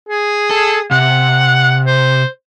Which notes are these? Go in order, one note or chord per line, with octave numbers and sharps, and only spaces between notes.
G#4
A4
C3 F#5
C5